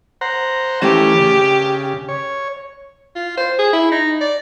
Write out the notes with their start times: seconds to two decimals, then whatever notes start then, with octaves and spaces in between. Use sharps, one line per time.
0.21 C5 F#5 A#5
0.82 E3 A3 C#4 G4
1.20 C#3
2.09 C#5
3.16 F4
3.37 C5
3.59 G#4
3.73 E4
3.91 D#4
4.21 D5